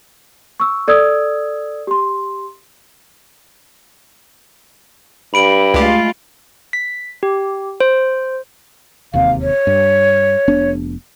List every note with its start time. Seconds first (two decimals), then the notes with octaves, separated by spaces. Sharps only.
0.60 C#6 E6
0.88 A4 D5 D#6 E6 G#6
1.87 G4 C6
5.34 G2 B5 D7 F#7
5.74 C#2 G#3 A3 F4 G4
6.73 B6
7.23 G4
7.80 C5
9.13 E1 D#2 C3 F5
9.41 C#5
9.67 G2
10.48 F1 B3 D4